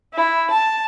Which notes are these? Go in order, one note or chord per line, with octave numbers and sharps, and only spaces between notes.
E4
A5